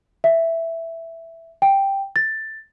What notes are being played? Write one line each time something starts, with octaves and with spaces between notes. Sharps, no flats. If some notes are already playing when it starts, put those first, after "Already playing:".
E5
G5
A6